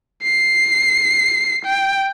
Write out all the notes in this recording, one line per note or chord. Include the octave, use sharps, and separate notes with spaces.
C7
G5